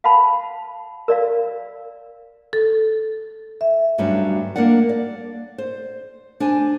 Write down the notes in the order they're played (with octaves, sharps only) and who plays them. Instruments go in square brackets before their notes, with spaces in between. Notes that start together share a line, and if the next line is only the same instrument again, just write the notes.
[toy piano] F5 F#5 A5 B5
A#4 D5 F5
[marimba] A4
E5
[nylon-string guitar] D2 G2 F#3 G3 C#4 D4
A#3 D4 A#4 D5 F#5
D5
C5
D4 C5 G#5